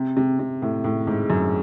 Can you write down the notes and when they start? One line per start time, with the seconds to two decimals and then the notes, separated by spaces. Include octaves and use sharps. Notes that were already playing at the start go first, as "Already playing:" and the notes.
Already playing: C3
0.17 C3
0.39 C3
0.62 A2
0.84 A2
1.07 G#2
1.30 F#2